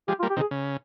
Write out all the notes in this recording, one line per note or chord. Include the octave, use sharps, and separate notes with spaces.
F3 G#3 G4
F4
G3 A#3
G4
C3 D#3
G#4
C#3